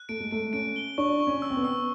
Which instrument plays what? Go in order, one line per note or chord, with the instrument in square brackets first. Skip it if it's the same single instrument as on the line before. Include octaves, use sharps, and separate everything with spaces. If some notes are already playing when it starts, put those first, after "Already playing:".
Already playing: [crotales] F#6
[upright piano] A3 [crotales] D7
[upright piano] G#3
[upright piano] A3 [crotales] D7
[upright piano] C#4 [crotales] D7
[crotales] G7
[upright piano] D4 [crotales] C#6
[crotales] C#6
[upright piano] C#4
[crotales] E6
[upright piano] C4
B3
[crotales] E6